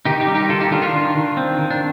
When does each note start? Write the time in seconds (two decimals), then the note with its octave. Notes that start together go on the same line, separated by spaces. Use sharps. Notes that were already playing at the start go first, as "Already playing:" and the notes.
0.05 D#3 D#4 G4
0.20 D#4 G4
0.27 G3
0.35 D#4 G4
0.49 D#3 F4 A4
0.60 D#4 G4
0.71 D#3 D4 F4
0.82 D4 F4
0.93 D#3
1.15 D#3
1.37 C4
1.58 D#3
1.71 D4